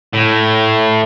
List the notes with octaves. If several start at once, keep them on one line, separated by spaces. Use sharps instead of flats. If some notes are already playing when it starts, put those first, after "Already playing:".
A2